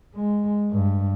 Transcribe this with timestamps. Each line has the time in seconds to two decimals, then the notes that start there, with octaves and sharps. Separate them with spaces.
0.15 G#3
0.71 G2